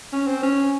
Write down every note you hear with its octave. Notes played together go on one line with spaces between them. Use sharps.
C#4
C4
C#4